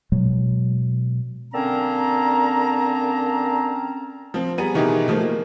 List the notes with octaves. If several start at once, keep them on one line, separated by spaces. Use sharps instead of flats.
B2 F#3 G#3
D3 A#3 C4 C#4 A5 A#5
F3 C4
G3 B3 G#4 A#5 D#7
B2 D#3 E3 D#4 G4 G#4
D#3 F3 A3 A#3
A#3